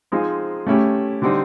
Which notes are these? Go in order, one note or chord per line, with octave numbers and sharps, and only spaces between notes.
F3 G#3 C4 D#4
A3 C#4 E4 G4
D3 G3 C4 D#4